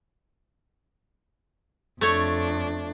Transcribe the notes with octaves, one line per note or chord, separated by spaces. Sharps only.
F2 A3 D4 C#5